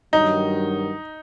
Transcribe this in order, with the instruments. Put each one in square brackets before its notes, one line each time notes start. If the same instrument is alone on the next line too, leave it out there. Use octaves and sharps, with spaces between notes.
[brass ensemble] G2 D#3 F#3 [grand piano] D#4